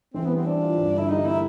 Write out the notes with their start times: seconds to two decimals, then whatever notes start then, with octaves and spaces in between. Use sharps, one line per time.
0.14 E3 C4
0.25 B3
0.30 G3
0.36 C4
0.46 C4 D4
0.62 F4
0.78 G2
0.94 D3 E4
1.09 G3 D#4
1.25 A#3 E4